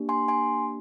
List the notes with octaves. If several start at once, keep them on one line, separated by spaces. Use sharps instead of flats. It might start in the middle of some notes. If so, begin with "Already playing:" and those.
Already playing: A#3 D4 G4
G#5 C6
G#5 C6